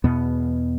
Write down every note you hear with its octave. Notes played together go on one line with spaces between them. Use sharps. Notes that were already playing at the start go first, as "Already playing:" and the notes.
E2 B2 B3